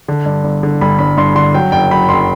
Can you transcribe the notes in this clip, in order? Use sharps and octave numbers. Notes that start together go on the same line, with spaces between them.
D3
G2
G1
D3
G1 B5
G1 B5
G2 C6
D3 C6
F#3 G5
F#1 G5
F#3 B5
F#1 C6